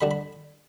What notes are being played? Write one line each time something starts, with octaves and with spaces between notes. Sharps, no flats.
D3 G3 D4 B5
B5